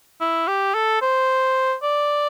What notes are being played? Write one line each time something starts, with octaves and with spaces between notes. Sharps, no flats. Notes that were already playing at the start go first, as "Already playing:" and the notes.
E4
G4
A4
C5
D5